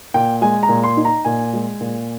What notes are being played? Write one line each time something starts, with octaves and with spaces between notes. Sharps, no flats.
A#2 G5
G#3 G#5
A#5
A#2
C6
D#4
A#5
A#2 G#5
G#3
A#2